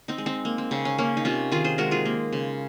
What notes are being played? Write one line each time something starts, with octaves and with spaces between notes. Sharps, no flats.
C4 D#4
G#3
C4 D#4
A#3
C4
C#3 C4
C#4
A#3 C#4
D#4
C3 C#4 F4
D#3 F4 G#4
G#4 C5
G#3 F#4 A#4
F4 G#4
A#3
C#3